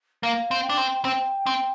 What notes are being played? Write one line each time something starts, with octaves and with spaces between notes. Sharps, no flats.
A#3 F5
C4
G5
D4
C4
C4 G5
C4